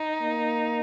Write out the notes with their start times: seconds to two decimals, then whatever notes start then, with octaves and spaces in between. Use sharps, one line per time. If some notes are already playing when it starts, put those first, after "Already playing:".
Already playing: D#4
0.22 A#3